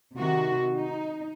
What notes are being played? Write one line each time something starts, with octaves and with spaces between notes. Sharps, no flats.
C3 D#3 F#4
D#4